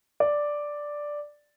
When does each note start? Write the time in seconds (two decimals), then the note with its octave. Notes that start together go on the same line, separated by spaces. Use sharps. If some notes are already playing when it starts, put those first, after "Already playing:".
0.20 D5